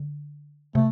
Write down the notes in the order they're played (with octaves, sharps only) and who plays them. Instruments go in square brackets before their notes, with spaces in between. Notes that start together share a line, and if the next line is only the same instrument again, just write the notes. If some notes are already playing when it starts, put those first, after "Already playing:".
Already playing: [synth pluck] D3
[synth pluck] C3 [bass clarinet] A3